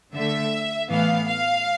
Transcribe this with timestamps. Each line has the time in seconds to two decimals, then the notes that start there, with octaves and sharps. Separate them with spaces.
0.15 D3 A3 E5
0.90 A2 E3 B3 F5
1.27 F5